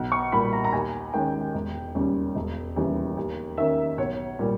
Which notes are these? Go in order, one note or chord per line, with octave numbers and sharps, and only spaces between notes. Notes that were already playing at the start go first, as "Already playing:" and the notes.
Already playing: B1
C#6
A#2 G3 B5
A#5
A#5
D#2 G#5
D#3 G#3 C#4 G5
E1
D#2 C#3 G3 C#4
E1
D#2 C#3 E3 G3
D#2
D#3 A#3 C#4 E5
B1 C#5
A#2 G3